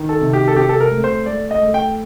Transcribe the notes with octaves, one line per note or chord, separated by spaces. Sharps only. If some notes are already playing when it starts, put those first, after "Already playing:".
Already playing: D#3
A4
C3
G4
A4
C4 G4
A4
A#4
A3
C5
A3 D5
D#5
A3
G5